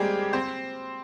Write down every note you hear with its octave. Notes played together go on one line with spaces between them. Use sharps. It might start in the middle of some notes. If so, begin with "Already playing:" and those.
Already playing: G3 G#3 A#3 C4 G4 G#4
C4 C5